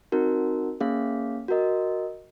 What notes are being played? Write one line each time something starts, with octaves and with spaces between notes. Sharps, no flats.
C4 D#4 F#4 A#4
A#3 C#4 G#4 C#5 F5
F#4 A#4 D#5